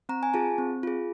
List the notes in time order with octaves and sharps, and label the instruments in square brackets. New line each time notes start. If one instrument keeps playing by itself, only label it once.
[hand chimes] C4 A#5
G#5
F4 G#4 A5
C4
F4 G#4